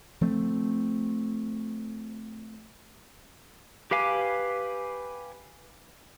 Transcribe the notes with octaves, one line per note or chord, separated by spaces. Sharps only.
F3 A3 C4
G4 B4 F5 G#5 D6